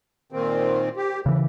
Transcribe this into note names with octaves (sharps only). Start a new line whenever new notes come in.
A#2 D#3 C4
G4
D#2 C#3 E3